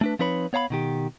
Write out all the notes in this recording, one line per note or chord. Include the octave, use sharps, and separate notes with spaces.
A3 D4 B4
F3 C4 D#4 B4 C#5 B5
B3 C#5 F5 A#5 B5
B2 D#3 G4